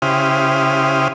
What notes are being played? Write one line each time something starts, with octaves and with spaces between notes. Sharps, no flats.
C#3 E4 G4 C5 D#6 F6